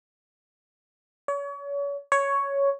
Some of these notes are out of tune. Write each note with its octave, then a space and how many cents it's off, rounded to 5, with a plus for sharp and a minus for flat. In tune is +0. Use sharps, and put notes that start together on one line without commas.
C#5 +35
C#5 +5